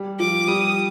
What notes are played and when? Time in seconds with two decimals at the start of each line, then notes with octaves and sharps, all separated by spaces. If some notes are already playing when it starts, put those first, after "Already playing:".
Already playing: G3
0.19 F3 D6
0.48 G3 D#6